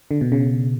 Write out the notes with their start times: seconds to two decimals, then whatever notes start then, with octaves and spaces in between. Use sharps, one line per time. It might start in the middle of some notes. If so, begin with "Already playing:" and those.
0.11 D3
0.21 B2
0.32 C#3